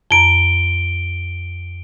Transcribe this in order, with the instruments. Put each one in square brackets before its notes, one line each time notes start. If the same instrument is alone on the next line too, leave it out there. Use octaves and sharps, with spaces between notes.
[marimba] F2 A#5 [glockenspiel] D7 G7